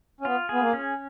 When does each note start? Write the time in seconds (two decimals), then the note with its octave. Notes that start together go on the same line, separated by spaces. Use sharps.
0.21 C#4
0.25 B3 F4
0.49 B3 G#4
0.61 A#3
0.73 C#4